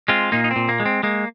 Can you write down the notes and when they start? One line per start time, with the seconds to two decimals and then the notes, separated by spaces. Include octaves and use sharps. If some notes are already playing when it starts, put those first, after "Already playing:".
0.08 G#3 C4 F4
0.32 A#2 A#3 D#4
0.44 D#4
0.51 C4
0.56 A#2
0.69 A#3
0.80 G#3
0.86 C4
1.03 G#3 A#3